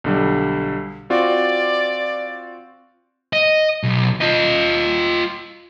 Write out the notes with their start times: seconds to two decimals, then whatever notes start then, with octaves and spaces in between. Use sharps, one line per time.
0.04 B1 D3 G3
1.10 C4 F4 F#4 D5
3.33 D#5
3.83 B1
4.21 F4 D#5